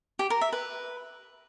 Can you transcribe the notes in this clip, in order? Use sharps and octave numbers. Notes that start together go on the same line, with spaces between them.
G4
A#4
E5
B4